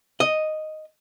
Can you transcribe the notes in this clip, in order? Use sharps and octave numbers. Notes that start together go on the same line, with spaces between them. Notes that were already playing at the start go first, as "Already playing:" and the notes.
D#5